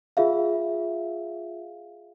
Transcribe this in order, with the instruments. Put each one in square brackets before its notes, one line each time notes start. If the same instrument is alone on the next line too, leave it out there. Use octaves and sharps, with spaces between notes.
[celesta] F4 G#4 E5 F5